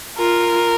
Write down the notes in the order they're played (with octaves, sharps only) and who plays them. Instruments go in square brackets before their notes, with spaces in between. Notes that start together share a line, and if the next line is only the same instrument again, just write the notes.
[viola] F4 [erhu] A#4